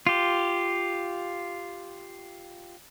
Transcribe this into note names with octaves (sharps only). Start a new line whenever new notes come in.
F4 G4